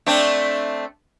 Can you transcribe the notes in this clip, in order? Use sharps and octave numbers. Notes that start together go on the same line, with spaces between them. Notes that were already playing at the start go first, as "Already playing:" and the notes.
A3 C4 D4